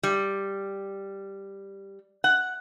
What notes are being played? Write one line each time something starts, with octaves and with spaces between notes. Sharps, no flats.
G3
F#5